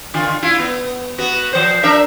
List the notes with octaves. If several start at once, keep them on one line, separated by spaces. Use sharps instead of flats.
D3 F4
E4 F4
B3
B3 F#4
F3 C5
D4 A#4 E5